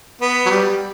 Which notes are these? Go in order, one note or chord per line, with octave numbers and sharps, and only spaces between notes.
B3
F#3
G3